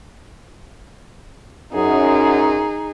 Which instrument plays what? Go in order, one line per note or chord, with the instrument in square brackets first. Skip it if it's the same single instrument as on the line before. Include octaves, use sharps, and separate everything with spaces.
[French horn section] F#2 [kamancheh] D#4 G#4